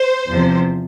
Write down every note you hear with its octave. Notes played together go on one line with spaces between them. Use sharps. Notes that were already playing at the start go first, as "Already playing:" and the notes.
Already playing: C5
E2 C3 F3